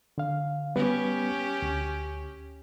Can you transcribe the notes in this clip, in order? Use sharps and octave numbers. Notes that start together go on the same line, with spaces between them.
D3 F5
G3 B3 C#4 G4 B4
D2